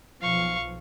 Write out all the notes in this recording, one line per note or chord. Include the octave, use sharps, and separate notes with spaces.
B1 F3 F5 C#6